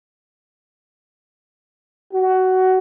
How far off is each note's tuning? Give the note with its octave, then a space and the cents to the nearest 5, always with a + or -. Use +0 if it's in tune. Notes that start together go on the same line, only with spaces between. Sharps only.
F#4 +15